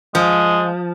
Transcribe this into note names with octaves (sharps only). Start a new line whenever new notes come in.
F3 G#3